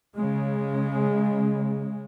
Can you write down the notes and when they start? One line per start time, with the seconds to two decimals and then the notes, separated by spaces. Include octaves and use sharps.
0.17 C#3 G#3